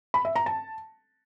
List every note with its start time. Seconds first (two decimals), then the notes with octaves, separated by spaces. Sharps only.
0.14 B5
0.25 E5
0.36 A#5
0.46 A5